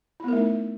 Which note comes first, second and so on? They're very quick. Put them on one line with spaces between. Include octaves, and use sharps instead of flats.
E4 B3 A#4 A3 D#4